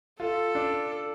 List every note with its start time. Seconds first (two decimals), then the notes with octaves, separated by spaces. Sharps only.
0.20 F4 A4
0.55 D4